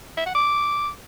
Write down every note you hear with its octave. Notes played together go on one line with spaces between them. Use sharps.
E5
F#5
D6